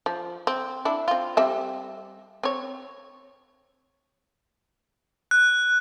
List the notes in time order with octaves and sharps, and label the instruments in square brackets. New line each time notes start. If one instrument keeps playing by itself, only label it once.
[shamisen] F3
C4
D4 E4
C4 F4
G3 C4 E5
C4 C#5
[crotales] F#6